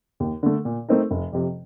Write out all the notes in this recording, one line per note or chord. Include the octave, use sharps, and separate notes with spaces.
D#2
D3 A3
A#2
A3 C4 D#4 A#4
F1
F2 C3